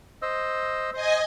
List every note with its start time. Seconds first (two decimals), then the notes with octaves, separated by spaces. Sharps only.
0.22 C5 D#5 E6
0.93 C5 D#5 G#5